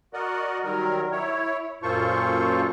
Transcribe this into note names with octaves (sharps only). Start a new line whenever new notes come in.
F#4 A#4 D5 D#5 F#5
D#3 F#3 G3 A#4
E4 C#5
F#2 A#2 F4 A4 C5 C#6